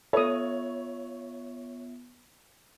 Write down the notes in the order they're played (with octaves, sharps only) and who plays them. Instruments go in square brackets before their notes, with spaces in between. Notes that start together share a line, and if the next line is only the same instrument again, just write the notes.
[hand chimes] B3 F4 E5 [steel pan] A4 D#6 [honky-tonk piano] C#5